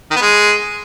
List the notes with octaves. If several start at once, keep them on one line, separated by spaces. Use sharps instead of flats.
D#3
B3
G#3